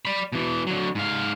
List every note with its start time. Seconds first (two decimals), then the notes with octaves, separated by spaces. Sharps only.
0.05 D5 B5
0.33 B2 E3
0.67 D3 F#3
0.95 G#2 F5